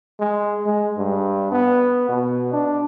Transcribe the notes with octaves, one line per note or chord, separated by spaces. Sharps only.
G#3
G#3
G2
B3
B2
D4